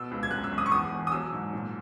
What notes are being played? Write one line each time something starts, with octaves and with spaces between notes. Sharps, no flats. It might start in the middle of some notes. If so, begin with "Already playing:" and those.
Already playing: B2 E6
C#2
G#6
F#2 F#6
E6
G#1
D#6
C#6
E2 D#6
E1
D#6
F#3 E6
G#2
A#2